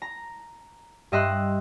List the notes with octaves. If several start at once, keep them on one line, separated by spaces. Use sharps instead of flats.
A#5
G2 G4 D#5 E5 C6 F#6